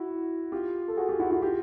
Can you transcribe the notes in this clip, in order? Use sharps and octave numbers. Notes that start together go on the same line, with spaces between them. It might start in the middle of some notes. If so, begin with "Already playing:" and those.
Already playing: E4 F#4
F4 G4
A4
F#4 G#4
F4 G4
E4 F#4
E4 F#4
F4 G4